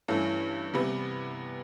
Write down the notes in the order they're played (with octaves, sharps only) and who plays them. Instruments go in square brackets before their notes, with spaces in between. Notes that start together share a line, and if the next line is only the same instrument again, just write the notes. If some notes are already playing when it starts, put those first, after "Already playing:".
[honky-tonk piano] G2 E3 A3 C#4
C3 E3 G3 B3 E4